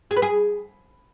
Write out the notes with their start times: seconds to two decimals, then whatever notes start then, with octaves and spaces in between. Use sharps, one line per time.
0.11 G#4
0.16 B4
0.22 G#4